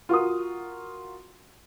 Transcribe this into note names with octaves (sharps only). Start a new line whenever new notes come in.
F4 F#4 A#4 D#6